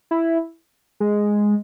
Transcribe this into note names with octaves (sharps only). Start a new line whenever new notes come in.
E4
G#3